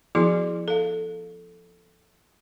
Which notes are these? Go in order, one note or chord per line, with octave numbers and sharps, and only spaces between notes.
F3 B3 E4 F#4 G#4 C6
A4 F5